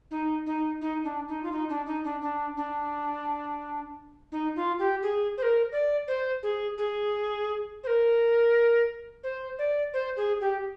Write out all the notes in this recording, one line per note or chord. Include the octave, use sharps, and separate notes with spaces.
D#4
D#4
D#4
D4
D#4
F4
D#4
D4
D#4
D4
D4
D4
D#4
F4
G4
G#4
C5
A#4
D5
C5
G#4
G#4
C5
A#4
C5
D5
C5
G#4
G4